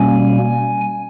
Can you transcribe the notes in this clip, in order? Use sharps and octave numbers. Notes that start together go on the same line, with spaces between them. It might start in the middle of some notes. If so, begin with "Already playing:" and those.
Already playing: B2 G3 A#3 C#4 G#5